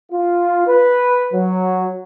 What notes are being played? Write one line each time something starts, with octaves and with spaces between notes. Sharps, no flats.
F4
B4
F#3